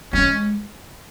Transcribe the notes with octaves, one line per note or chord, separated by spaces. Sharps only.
G#3 C#4